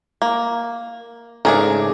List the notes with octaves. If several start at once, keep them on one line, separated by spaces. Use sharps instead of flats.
A#3
G#2 C#3 A3 D4 G#4 A#4